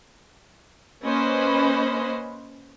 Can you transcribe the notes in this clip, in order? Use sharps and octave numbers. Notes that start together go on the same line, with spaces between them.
A#3 C#4 B4 C5 D#5 B5